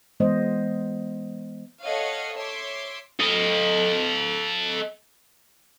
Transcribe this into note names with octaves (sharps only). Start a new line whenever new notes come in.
E3 G#3 B3 C5 D#5
A4 C#5 D#5 F5 F#5
C#5 E5 C6 D6
A4 D#5